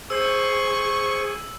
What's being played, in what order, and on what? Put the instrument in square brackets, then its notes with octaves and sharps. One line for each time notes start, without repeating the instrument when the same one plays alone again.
[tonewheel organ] G#4 [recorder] C5 [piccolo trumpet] C#6 [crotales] E6